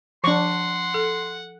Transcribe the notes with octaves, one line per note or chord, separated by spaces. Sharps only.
F3 D4 F#5 C6 C#6
A4